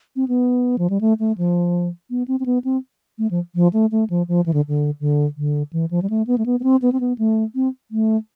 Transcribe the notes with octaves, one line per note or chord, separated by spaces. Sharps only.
C4
B3
F3
G3
A3
A3
F3
B3
C4
C4
B3
C4
A3
F3
F3
A3
A3
F3
F3
E3
D3
D3
D3
D3
E3
F3
G3
A3
B3
A3
B3
B3
C4
B3
C4
B3
A3
C4
A3